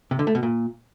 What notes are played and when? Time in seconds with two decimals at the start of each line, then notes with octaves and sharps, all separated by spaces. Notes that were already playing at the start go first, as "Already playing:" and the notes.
0.11 C3
0.19 D3
0.27 A3
0.35 B2
0.43 A#2